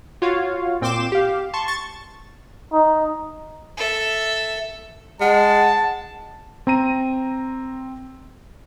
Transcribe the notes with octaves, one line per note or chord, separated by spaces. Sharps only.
F4 F#4 C#5 F5
A#2 C4 G5 C6 D6 E7
G4 F5
A5 C6 C#6
C#6 A6
D#4
A4 E5
G#3 F#5 A5
C4 A#5 D#7